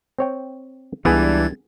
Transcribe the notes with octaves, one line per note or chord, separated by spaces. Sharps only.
C4 C#5 G5
C#2 E3 G3 B3 D4 G#4 G#6 A6